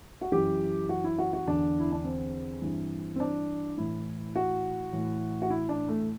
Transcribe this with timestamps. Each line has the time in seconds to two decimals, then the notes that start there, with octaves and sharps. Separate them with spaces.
0.21 F#4
0.32 F#2 E3 G4
0.89 F#4
1.04 E4
1.18 F#4
1.33 F#4
1.47 E2 D3 D4
1.80 E4
1.92 D4
2.04 C4
2.62 G2 E3
3.16 C4
3.20 D4
3.77 A2 E3 E4
4.36 F#4
4.93 A2 E3
5.42 F#4
5.50 E4
5.69 D4
5.88 A3